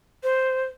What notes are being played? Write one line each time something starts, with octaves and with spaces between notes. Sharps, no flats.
C5